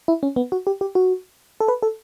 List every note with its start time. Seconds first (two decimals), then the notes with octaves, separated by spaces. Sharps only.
0.08 E4
0.23 C#4
0.36 B3
0.52 F#4
0.67 G4
0.81 G4
0.95 F#4
1.61 A4
1.68 B4
1.83 A4